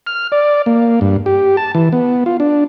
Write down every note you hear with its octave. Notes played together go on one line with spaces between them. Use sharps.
F6
D5
A#3
G2
G4
A5
E3
B3
F4
D4